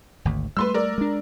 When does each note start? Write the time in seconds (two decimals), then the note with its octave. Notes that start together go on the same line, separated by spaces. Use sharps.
0.25 G#1 D2
0.57 G3 A3 B4 C6 E6
0.74 A#4 D5
0.98 G#3 D4